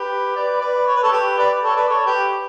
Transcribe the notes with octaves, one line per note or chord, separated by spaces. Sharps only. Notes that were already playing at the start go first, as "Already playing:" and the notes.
Already playing: G4 B4
B4 D5
B4 D5
C#5
B4
A4 C#5
G4 B4
B4 D5
A4 C#5
B4 D5
A4 C#5
G4 B4